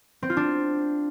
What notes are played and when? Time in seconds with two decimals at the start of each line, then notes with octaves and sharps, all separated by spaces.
0.22 C4
0.30 F4
0.37 D4